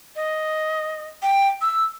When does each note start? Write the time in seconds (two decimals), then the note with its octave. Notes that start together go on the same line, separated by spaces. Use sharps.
0.16 D#5
1.23 G5
1.62 E6